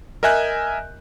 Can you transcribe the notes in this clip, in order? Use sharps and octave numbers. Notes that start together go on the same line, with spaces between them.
A#4 D#5 E5 G#5 F#6 G6